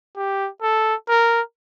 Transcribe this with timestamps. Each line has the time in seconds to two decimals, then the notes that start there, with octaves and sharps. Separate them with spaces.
0.17 G4
0.63 A4
1.09 A#4